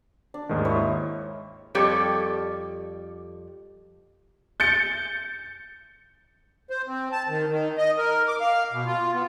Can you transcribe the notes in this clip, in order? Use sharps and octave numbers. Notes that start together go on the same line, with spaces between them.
D4
D#2 G#2 D#3
E4 C#5 D#5
F2 G3 G4 A4 C#5
G6 A6 C#7
C5
C4
A5
D#3
D#3
D#5
A#4
D6
F5
B2
F4
B3